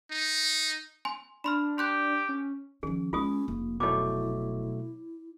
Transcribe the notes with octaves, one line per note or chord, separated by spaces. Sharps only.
D#4
G#5 C6
D4 B5 C6 F6
G4 C6 F#6 G6
C#4
D#3 F3 C#4 G#4
G#3 B3 C#4 F4 G#4 D#6
F1 A#3
B2 F#3 A3 E4 C#5 D6